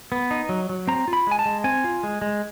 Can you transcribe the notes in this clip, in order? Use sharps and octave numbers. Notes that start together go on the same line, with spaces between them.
B3
D#4
F#3
F#3
C4 A#5
F4
B5
G#3 G#5
A5
G#3
C4 G#5
F4
G#3
G#3